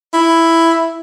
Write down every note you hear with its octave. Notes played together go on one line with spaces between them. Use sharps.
E4